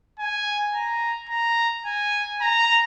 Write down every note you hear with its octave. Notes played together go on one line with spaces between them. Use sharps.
G#5
A#5
A#5
G#5
A#5